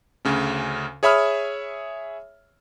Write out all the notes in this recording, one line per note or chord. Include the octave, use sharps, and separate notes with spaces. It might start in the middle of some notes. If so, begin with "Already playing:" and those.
D2 C#3 C#4
G#4 C#5 E5 B5 D#6 F6